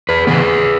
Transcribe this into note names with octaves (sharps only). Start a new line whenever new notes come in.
G#4 B4
C#3 E3 B3 G#4 B4